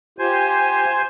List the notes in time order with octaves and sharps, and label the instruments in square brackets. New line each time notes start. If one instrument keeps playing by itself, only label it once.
[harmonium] F4 G4 [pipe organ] C5 G#5